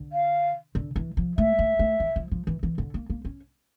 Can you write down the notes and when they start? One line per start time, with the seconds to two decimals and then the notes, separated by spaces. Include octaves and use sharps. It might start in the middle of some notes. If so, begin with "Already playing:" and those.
Already playing: D3
0.13 F5
0.75 D3
0.96 E3
1.17 F3
1.38 A3 E5
1.59 A3
1.79 A3
2.00 E3
2.16 F3
2.31 F3
2.47 E3
2.63 E3
2.78 D3
2.94 A#3
3.10 A#3
3.25 C#4